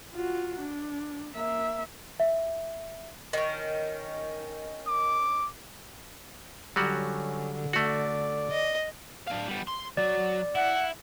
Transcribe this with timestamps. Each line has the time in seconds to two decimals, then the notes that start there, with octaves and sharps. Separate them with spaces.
0.13 F4 F#4
0.61 D4
1.34 A#3 E5
2.20 E5
3.33 D#3 C#4
4.87 D6
6.76 D3 F#3 G3 C#4 F#4
7.73 A3 F#4 D5
8.51 D#5
9.27 D4 F5
9.48 G3 B3
9.67 C6
9.97 F#3 D5
10.55 E4 F#5